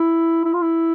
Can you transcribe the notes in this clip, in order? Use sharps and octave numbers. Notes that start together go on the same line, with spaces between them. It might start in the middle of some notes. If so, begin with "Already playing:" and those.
Already playing: E4
E4
F4
E4